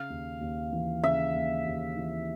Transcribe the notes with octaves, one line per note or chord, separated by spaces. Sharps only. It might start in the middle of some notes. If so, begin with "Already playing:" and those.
Already playing: C#3 F5
D#2
D#2
E3
C#3 E5
D#2
D#2
E3